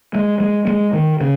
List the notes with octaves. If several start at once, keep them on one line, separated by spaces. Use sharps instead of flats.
G#3
G#3
G#3
D#3
C#3